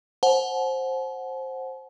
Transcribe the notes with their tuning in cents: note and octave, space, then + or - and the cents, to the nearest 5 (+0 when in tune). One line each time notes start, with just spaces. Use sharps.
C5 +15 F#5 +0 A5 -45